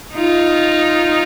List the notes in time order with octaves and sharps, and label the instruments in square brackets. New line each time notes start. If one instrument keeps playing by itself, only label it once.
[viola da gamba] D#4 F4